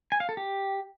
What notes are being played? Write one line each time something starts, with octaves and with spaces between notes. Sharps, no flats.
G#5
F5
A4
G4